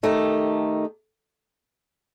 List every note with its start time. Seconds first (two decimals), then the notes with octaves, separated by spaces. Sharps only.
0.03 D#3 A3 D#4 G4